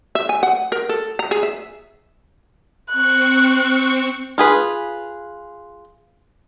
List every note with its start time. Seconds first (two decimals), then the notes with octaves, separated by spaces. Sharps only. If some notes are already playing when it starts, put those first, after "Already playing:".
0.15 E5
0.29 G#5
0.43 F#5
0.72 A#4
0.89 A4
1.19 A#5
1.31 G#4
1.43 E5
2.88 C4 C#6 F#6
4.38 F4 G#4 B4